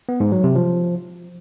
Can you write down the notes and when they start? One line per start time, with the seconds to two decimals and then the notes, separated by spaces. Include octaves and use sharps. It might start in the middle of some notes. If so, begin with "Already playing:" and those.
0.09 B3
0.20 G#2
0.32 F#3
0.44 C3
0.55 F3